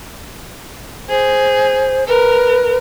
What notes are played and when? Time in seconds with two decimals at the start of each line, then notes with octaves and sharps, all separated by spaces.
1.10 G#4 C5
2.08 A#4 B4